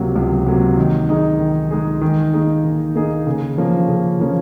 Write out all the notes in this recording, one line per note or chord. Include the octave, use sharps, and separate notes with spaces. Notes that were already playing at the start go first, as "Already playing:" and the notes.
Already playing: C#2 C3 F#3 A#3
C#2
C3 F#3 A#3
D#3
G#3 D#4 G#4
D#3
G#3 D#4 G#4
D#3
A#3 D#4 G#4
D#3
A#3 D#4 G#4
C#3
F3 A#3 C#4
C#3
F3 A#3 C#4